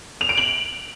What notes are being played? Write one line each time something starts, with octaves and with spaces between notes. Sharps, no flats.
F7
D7
F#7